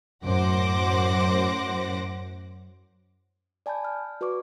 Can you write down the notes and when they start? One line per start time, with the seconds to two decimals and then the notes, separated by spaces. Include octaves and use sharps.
0.24 F#2 A2 C5 F#5 D6 A#6
3.66 D5 G#5 A5 B5 G6
3.84 F6
4.21 F#4 B4 D5 C#6 D6